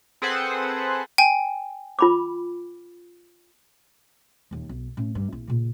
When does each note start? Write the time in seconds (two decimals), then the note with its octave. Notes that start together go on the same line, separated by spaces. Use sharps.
0.22 C4 G#4 A4 B4 C5 F#5
1.18 G5 G#5
1.99 F4 B5 D6
4.51 D#1 D#2
4.69 B1
4.97 A2 C#4
5.15 G2
5.32 A#1 E4
5.48 A#2 C#3